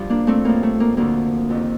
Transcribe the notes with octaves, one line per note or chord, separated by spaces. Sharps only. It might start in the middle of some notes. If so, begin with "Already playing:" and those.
Already playing: G2 F3
A#3 D4
A3 C4
A2 F3 A#3
A3
A#3
D2 D3 F3 A#3
F2 C3 D#3